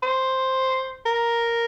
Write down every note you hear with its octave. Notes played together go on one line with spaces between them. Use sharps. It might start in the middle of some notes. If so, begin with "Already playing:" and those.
C5
A#4